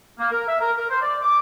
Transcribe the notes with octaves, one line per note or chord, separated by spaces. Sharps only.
A#3
A#4
E5
A#4
A#4
C5
D5
D6